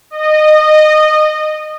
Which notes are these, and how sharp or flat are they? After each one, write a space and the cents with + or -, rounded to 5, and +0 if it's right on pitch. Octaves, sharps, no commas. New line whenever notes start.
D#5 -20